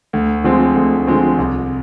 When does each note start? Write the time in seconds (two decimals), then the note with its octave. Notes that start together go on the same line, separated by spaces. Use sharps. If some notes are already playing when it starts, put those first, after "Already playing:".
0.13 D2
0.44 D3 F3 G#3 C4
0.75 D2
1.07 D3 F3 G#3 C4
1.38 C2